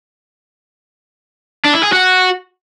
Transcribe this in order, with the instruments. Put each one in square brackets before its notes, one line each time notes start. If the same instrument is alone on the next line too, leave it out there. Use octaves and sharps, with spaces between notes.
[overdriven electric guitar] D4
E4
G#4
F#4